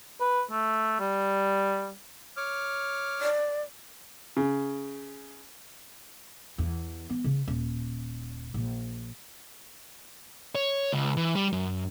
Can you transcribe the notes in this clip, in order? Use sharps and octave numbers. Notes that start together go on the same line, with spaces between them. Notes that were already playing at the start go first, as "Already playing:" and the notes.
B4
A3
G3
C#5 D6 F6
D5
C#3
E2
B3
C#3
D#1
A#1
C#5
C#2
E3
G3
F#2